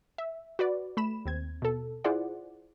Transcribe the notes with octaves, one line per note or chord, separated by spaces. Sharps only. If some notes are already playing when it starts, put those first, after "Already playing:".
E5
F#4 B4 D5
A3 B5 E7
D#2 C4 G#6
B2 A4
E4 F4 G#4 C5 D5 F#5